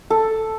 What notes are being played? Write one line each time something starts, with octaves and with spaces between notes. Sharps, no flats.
A4